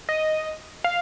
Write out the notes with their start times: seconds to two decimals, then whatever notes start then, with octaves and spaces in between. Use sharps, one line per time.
0.09 D#5
0.84 F5